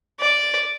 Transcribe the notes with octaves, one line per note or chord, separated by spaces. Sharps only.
D5